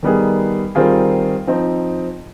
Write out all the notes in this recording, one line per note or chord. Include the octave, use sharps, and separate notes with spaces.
D#3 G3 B3 D#4 G#4
D#3 G3 C4 F4 G#4
F3 C4 D#4